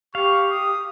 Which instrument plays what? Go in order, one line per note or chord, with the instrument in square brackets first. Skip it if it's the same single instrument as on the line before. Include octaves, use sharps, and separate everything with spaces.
[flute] G4 [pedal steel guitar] F5 [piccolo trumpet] C#6
[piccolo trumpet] D#6